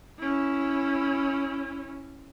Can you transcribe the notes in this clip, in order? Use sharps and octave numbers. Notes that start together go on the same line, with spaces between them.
C#4 E4